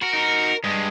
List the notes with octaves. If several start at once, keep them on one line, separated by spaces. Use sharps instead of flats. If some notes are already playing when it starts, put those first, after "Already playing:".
F#4 A#4
D#4 F#4
G2 G#3